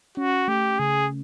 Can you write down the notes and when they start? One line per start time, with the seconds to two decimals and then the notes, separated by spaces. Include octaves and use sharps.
0.17 C#4 F#4
0.48 A3 G4
0.79 C#3 G#4